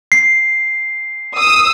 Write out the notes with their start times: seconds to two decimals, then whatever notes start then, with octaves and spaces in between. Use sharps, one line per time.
0.12 C7
1.38 D#6 E6